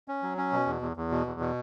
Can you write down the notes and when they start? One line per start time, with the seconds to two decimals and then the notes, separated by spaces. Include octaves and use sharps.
0.08 C#4
0.23 F#3
0.38 C#4
0.52 B2
0.67 E2
0.82 E2
0.97 E2
1.11 B2
1.26 E2
1.40 B2